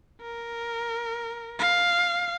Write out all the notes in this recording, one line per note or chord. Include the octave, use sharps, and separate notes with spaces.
A#4
F5